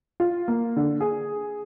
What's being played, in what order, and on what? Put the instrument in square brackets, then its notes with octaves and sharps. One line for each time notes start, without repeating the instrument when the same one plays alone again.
[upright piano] F4
A#3
D3
G#4